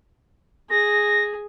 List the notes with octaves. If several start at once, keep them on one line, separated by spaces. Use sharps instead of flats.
G#4 A#6